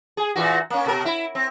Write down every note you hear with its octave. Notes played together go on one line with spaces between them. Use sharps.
G#4
A#2 E3 F#4
A#3 C#4
B2 A#4
E4
C4